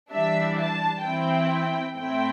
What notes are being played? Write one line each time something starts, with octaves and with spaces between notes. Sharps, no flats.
E3 G3 D4 E5
A5
E3 C4 E4 G5
A2 A3 C4 E4 G5